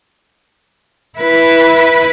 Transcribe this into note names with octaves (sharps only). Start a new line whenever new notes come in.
E4 B4